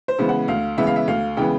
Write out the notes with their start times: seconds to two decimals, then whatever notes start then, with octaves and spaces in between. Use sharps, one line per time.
0.08 C5
0.19 C#3 E3 G#3 B3
0.29 F#5
0.48 D2 F5
0.78 C#3 E3 G#3 B3 E5
0.87 F5
0.96 E5
1.08 D2 F5
1.37 C#3 E3 G#3 B3 G5